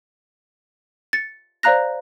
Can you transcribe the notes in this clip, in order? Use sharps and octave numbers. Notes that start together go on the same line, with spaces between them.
A6 C#7
C5 D5 F5 A#5 F#6 A#6